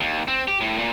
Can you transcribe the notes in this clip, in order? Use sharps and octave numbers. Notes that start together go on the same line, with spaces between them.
D#2
C4
G4
A2
A#2